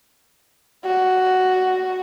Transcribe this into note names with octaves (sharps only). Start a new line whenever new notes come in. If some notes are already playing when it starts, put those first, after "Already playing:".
F#4